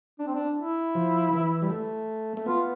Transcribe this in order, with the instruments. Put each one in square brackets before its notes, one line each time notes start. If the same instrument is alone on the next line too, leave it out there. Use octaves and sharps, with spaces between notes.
[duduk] D4
C4
D4
E4
[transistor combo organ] F3
E3
G3
A3
A3
[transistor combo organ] B3 [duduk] F4